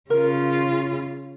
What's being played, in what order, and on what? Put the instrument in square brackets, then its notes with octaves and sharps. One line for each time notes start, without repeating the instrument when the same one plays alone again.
[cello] C#3 F4 [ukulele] A#4